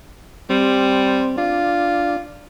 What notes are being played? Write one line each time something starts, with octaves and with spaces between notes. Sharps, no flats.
G3 C4
D4 F4